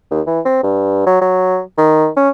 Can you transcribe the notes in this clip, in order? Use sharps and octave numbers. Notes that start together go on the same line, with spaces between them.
D#2
E3
C4
G2
F#3
F#3
D#3
C#4